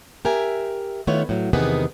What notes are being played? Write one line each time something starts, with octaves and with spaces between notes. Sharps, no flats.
G4 A#4 E5 G#5
D#3 A3 B3 E4 F4 C#5
A2 F#3
E2 C3 D#3 B3 G#4 B4